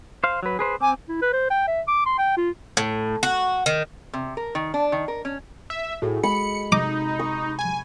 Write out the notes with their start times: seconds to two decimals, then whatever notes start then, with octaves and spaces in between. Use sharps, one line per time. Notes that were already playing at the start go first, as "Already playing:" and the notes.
0.24 C5 F5
0.43 F#3 B4
0.59 G#4 B4 C5
0.80 C4 G#5 D6
1.09 E4
1.22 B4
1.33 C5
1.51 G5
1.68 E5
1.88 D6
2.06 C6
2.19 G5
2.37 F4
2.77 A2
3.23 F#4
3.66 D#3
4.13 C3
4.37 A#4
4.55 D#3
4.74 D4
4.92 D#3
5.08 A#4
5.25 C#4
5.70 E5
6.02 A2 F#4 G#4 A4
6.24 G#3 B5 C#7
6.72 C3 D#4 D6
7.19 C#6
7.59 G#5